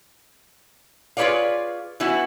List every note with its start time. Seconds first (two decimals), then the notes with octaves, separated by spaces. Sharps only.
1.17 F4 G#4 B4 C#5 D5 F5
2.00 E3 B3 E4 F#4